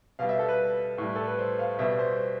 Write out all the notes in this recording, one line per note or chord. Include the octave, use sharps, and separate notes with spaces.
B2 G3 F5
E5
A4
B4
A2 G3
A4
B4
C5
F5
B2 G3 E5
C5